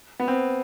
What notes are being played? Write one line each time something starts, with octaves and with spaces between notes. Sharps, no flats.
B3
C4